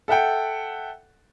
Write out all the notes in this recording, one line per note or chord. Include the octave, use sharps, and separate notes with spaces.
A4 E5 F#5 G5